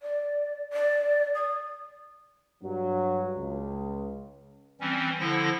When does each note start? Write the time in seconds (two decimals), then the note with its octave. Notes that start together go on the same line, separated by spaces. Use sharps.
0.02 D5
0.73 D5
1.35 D#6
2.63 G2 F#3
3.37 C#2
4.81 E3 G3 C4 C#4
5.20 D3 F3 E4 A4 A#6